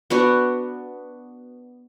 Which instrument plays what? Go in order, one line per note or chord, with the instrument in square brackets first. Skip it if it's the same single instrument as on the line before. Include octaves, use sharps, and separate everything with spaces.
[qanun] B3 D4 F#4